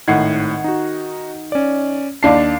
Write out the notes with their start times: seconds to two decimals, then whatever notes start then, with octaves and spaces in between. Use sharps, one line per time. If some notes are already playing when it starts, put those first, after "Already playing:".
0.08 G#1 A2 D#3 F#5 G#6 C7
0.64 D#4 F#4
1.52 C#4 D5
2.23 D#2 D4 A5 D6 C7